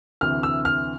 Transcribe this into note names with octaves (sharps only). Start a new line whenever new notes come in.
D2 C3 E3 F6
E6
F6